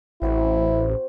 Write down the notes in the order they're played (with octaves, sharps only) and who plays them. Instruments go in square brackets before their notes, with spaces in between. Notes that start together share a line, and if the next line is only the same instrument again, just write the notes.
[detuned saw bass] A1 [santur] C4 F#4 C5 [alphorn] E4